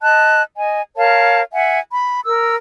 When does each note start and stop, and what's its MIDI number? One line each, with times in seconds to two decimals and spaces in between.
0.01 0.42 75
0.01 0.42 81
0.01 0.42 90
0.57 0.81 75
0.57 0.81 80
0.97 1.42 70
0.97 1.42 73
0.97 1.42 77
0.97 1.42 81
1.53 1.79 76
1.53 1.79 78
1.53 1.79 80
1.92 2.22 83
2.26 2.55 70
2.26 2.55 88